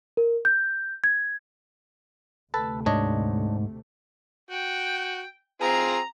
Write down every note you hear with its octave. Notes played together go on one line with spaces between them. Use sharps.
A#4
G6
G#6
D2 C3 A3 A4 B4 A5
G#2 D4 C#5 D#5
F#4 G5
C4 F4 G#4 A#5